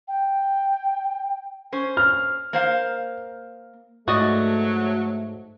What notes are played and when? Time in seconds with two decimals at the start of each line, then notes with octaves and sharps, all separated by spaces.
0.08 G5
1.72 C#4 C5
1.97 F6
2.53 A#3 C5 F5
4.08 G#2 F#3 A3 F#4 D5 D#5